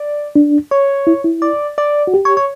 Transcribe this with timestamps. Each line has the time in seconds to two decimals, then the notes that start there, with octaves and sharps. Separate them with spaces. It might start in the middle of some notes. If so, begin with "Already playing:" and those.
Already playing: D5
0.36 D4
0.71 C#5
1.07 E4
1.24 E4
1.42 D5
1.78 D5
2.07 F#4
2.14 G4
2.25 C#5
2.37 C#5